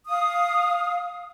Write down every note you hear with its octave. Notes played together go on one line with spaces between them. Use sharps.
F5 D#6